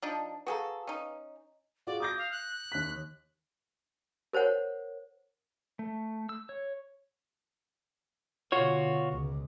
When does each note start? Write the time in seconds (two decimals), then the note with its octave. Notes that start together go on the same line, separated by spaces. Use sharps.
0.02 F3 D4 D#4
0.47 F#4 G#4 A4 B4 F5 A#5
0.87 C#4 D#4
1.87 F4 F#4 G#4 D5
2.00 D6 D#6 G6 A#6
2.18 F5
2.32 F#6
2.72 D#2 B6
4.33 A#4 C5 C#5 F#5
5.79 A3
6.29 E6
6.49 C#5
8.52 B2 D3 F4 F#4 C#5
9.12 C#2